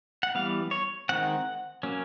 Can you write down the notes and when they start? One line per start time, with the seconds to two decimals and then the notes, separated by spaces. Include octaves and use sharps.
0.23 F#5
0.35 E3 G3 B3 F5
0.71 C#5
1.09 D#3 G#3 C4 F#5
1.83 F#3 A#3 C#4